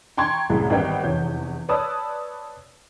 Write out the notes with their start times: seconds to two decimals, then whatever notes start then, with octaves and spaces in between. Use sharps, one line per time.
0.17 G5 A#5 C6 C#6 G#6
0.50 C2 F#2 A2 G#3
0.70 G#1 G3 B3 D#4 G5
1.04 F1 E2 C#5 G6
1.69 B4 C#5 D5 A5 D#6 E6